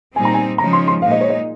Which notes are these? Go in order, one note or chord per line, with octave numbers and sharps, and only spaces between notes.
A#2 G3 C4 D#4 G#5
A#5
G#5
C#3 F3 G#3 D#4 A#5
C6
C6
A#2 G#3 D#4 F5
D#5
C#5
D#5